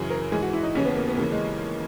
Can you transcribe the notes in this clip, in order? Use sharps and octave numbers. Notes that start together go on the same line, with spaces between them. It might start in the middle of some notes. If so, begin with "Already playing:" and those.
Already playing: F#2 C#3 E3 G#4
A#4
G#2 E3 G#4
F#4
E4
D#4
D#2 C#3 E3 C#4
B3
A#3
B3
D#2 C#3 E3 A#3
G#3